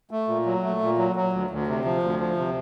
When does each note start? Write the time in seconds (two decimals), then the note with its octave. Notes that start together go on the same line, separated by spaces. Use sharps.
0.11 A3
0.28 A#2
0.46 F#3
0.63 A3
0.81 A#2
0.98 F#3
1.16 F#3
1.33 D2
1.50 D2
1.67 C3
1.85 F3
2.03 D2
2.20 F3
2.37 C3